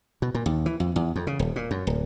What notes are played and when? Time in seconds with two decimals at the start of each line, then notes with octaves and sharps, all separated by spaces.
0.22 B2
0.35 A#2
0.46 D#2
0.66 E3
0.80 F2
0.96 E2
1.16 F2
1.27 C#3
1.39 D#1
1.56 A#2
1.71 F#2
1.87 D1